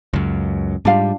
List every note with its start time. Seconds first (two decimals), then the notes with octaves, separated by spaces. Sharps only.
0.13 C#2 F#2
0.85 G#2 G3 D4 F4 F5